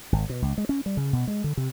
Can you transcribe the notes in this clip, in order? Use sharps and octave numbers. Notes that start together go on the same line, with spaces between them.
G#1
B2
C#2
G#3
C#4
G3
C#3
B2
G#3
D3
C3